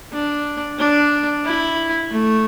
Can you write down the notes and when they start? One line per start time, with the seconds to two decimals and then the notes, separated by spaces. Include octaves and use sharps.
0.12 D4
0.79 D4
1.45 E4
2.10 A3